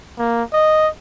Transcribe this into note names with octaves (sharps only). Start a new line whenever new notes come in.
A#3
D#5